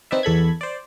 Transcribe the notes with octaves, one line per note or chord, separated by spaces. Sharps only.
C4 D#4 B4 D5 E5
E2 A4 B5 G#6
C5 D5